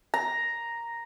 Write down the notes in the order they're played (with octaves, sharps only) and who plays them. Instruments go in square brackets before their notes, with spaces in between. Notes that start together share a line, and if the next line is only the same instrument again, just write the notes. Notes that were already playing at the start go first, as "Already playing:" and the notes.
[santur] A#5